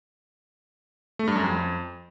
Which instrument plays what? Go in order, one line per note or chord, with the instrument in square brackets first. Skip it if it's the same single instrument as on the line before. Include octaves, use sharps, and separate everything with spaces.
[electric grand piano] A3
G2
F#2
F2